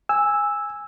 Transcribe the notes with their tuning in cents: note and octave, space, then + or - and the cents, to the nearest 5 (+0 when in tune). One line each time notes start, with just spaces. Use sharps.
G#5 -10 E6 -5